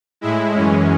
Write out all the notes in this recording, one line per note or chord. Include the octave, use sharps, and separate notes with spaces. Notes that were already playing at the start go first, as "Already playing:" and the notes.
A2 G#3 E4
F#2 E3 G#3 C#4